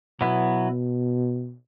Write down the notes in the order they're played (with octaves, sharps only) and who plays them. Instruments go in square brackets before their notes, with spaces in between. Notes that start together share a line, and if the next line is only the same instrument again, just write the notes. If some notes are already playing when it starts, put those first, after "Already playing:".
[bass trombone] B2 [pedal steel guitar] F#3 B3 E4